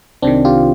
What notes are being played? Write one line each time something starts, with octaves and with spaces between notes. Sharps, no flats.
C2 C3 D#3 C4 D4
F4 G4